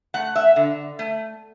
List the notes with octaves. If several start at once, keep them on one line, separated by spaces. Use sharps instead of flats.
A3 F#5
E5
D3
A3